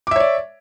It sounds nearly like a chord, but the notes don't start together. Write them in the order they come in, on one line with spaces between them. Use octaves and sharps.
D6 E5 C#5 D5